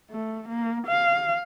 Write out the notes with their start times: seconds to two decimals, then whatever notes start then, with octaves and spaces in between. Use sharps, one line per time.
0.11 A3
0.49 A#3
0.87 F5